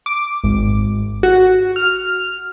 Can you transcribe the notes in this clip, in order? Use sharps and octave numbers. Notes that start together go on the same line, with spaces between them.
D6
G#1
F#4
F6